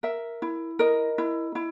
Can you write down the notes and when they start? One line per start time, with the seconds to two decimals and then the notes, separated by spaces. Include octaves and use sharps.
0.03 A#4 E5
0.42 E4
0.79 A#4 D#5
1.18 E4
1.55 E4